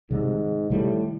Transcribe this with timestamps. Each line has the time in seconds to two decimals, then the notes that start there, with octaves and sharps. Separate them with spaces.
0.11 G#2 C3 D#3 G3
0.70 A2 C3 D#3 G3